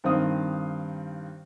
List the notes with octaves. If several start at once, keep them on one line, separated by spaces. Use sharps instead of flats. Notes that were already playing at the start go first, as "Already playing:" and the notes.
G2 D#3 C4 F5 D#6